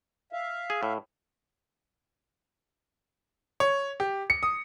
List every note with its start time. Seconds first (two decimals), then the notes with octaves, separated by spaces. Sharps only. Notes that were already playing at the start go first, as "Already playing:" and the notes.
0.33 E5 F5
0.70 G#4
0.83 A2
3.60 C#5
4.00 G4
4.30 C#7
4.43 D#6